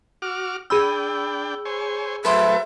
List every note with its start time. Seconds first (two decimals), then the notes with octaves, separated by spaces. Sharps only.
0.22 F#4 D6 F6
0.70 D4 G#4 G5 B5 E6
1.65 C5 C#5 G#5
2.25 F#3 A3 A4 B4 C5 E5